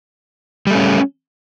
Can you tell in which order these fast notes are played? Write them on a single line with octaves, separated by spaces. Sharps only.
G3 A3 C#4